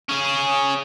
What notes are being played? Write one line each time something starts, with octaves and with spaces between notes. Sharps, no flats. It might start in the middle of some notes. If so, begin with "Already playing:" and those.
C#4 G#4